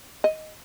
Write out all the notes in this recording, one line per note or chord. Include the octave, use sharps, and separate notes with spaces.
D#5